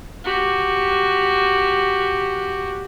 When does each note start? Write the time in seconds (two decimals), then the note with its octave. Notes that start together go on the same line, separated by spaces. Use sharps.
0.25 F#4 G4